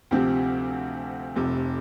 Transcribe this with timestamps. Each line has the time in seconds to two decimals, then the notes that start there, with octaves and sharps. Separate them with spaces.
0.11 D2 C3 F3 C4 G4
1.36 F1 F2 C3